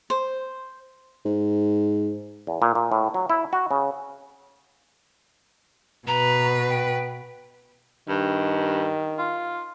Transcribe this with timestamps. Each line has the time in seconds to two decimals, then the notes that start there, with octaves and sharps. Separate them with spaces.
0.10 C5
1.26 G#2
2.47 E2
2.62 A#2
2.75 A#2
2.92 A2
3.14 F#3
3.30 E4
3.53 F#4
3.71 C#3
6.08 B2 B4 A#5
6.69 G5
8.08 G2 D#3
9.18 F4